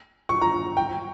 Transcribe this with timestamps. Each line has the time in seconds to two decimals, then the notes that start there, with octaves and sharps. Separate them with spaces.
0.29 C#6
0.41 A#5
0.77 G5